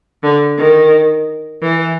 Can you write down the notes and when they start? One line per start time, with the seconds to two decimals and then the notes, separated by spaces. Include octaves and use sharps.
0.23 D3
0.58 D#3
1.62 E3